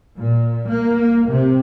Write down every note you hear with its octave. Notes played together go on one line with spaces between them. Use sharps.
A#2
A#3
C3